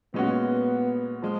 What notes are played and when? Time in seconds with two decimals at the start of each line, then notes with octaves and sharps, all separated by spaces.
0.14 A#2 G#3 B3 C#4 F#4
1.22 F3 G#3